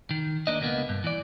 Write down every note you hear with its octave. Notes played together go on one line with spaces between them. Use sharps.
D#3
A#3 D4 D#5
C#2 B2 A#3 B3
G2
E3 D5